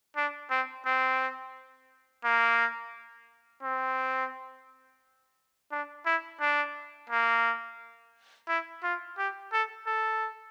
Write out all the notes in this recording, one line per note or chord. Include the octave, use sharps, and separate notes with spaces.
D4
C4
C4
A#3
C4
D4
E4
D4
A#3
E4
F4
G4
A4
A4